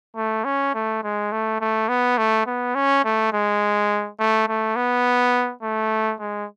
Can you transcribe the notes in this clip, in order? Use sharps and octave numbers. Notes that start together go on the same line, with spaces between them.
A3
C#4
A3
G#3
A3
A3
B3
A3
B3
C#4
A3
G#3
A3
A3
B3
A3
G#3